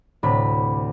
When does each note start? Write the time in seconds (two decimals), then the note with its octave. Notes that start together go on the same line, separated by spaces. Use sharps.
0.23 D2 A2 C3 B5